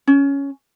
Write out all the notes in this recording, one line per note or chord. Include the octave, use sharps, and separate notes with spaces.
C#4